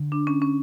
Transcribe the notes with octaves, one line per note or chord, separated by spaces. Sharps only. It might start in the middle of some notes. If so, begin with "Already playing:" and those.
Already playing: D3
D4
C#4
C#4